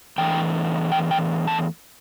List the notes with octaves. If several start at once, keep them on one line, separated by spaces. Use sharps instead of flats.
E2 E3 A3 D4 G5
G5
G5
A5